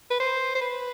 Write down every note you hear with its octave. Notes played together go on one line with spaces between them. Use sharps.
B4
C5
C5
B4